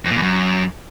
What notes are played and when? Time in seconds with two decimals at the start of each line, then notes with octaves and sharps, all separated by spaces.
0.05 F2
0.11 A#2
0.16 E2
0.22 F#2